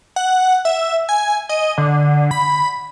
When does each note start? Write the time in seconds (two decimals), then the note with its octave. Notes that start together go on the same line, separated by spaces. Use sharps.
0.16 F#5
0.65 E5
1.09 G#5
1.49 D#5
1.78 D3
2.31 B5